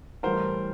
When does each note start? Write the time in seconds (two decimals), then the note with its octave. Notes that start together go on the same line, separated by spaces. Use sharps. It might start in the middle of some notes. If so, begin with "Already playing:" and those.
0.23 A2 E3 G3 A#4 C5